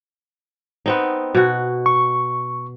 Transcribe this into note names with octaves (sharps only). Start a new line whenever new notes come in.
B3 C4 D#4
B2 F#4
C#6